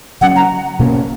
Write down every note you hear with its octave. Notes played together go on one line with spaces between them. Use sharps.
C#3 F#3 C#4 F#5
A#5
B2 A#3 C#4